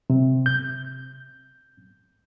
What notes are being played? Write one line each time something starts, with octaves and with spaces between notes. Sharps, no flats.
C3
G6